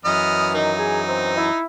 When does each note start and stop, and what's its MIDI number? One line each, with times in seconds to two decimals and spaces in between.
0.05 1.50 42
0.05 1.50 52
0.05 1.50 54
0.05 0.54 59
0.05 0.54 75
0.05 0.54 89
0.54 0.72 51
0.54 1.56 63
0.79 1.01 68
1.09 1.35 60
1.37 1.64 64